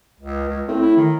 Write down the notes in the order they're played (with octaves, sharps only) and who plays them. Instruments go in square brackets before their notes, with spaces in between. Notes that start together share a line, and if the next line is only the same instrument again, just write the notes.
[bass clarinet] C#2
C#2
[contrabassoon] A2 [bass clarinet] C4
[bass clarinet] E4
D#3